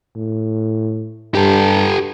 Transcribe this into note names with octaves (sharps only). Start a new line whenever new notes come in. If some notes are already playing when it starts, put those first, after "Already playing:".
A2
G2 G4 A4